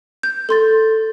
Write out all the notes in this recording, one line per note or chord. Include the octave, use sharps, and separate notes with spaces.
G6
A4 C6 A6